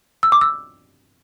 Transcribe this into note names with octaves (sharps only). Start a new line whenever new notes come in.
E6
D6
E6